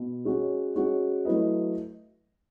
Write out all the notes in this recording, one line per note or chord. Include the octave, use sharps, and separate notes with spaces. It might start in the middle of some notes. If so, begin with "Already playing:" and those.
Already playing: B2
G#3 C#4 F#4 C#5
G#3 C#4 F#4 C#5
F#3 A3 E4 B4 D#5